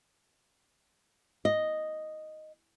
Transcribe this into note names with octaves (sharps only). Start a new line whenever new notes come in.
D#5